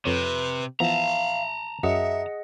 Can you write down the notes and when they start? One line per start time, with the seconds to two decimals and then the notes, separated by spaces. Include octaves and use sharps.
0.05 F2 C3 B4 C#5
0.80 E3 F3 B3 E5 F5 A5 A#5
1.83 F#2 G#4 D#5 E5 F#5